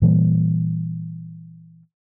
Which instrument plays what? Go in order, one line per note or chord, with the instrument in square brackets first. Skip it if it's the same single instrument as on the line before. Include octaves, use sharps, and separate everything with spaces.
[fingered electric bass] A#2 E3 G3 A#3